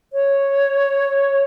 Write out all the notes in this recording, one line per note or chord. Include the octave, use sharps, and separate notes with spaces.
C#5